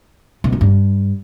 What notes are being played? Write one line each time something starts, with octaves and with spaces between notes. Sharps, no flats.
B2
F#2
G2